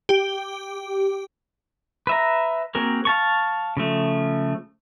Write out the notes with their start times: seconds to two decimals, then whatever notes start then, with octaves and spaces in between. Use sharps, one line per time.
0.09 G4
2.07 B4 E5 A#5
2.75 A#3 C4 F#4 G#4 A#4
3.05 F5 A5 C#6
3.77 C#3 F3 A3